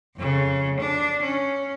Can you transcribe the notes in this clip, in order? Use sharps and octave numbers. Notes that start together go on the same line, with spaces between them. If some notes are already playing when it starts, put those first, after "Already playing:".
F2 C#3
D4
C#4